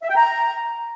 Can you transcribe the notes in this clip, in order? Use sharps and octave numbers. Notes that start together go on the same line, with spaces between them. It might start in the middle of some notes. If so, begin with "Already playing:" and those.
E5
G5
A#5